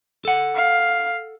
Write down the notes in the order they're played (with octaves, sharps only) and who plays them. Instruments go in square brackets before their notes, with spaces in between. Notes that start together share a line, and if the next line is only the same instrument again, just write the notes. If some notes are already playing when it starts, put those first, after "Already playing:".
[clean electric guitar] A4 F#5
[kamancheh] F5